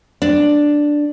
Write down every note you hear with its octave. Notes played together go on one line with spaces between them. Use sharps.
D4